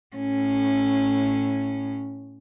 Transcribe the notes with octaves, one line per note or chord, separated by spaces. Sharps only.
A2 C#4